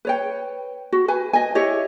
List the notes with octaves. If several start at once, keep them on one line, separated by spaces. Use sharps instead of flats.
B4 C#5 G5
F#4
B4 G#5
D#5 G#5
E4 G4 C#5 D#5